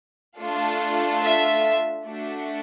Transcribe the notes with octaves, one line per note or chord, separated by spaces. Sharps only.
A3 D4 F4 A4
E5
A3 D4 F#4